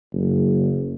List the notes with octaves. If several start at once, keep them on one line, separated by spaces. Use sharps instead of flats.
F#1